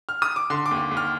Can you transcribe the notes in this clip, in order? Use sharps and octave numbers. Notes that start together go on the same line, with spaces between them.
F6
D#6
D6
D3 C6
D6
D#2
D#2
F6